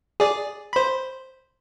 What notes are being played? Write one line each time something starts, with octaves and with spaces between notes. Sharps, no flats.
G#4 D5
C5 B5